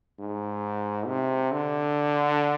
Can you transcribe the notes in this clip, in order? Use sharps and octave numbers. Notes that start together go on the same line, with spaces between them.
G#2
C3
D3